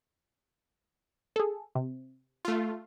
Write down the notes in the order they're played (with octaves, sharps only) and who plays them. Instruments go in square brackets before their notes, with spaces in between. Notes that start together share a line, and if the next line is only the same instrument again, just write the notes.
[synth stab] G#4 A4
C3
[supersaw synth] A3 F4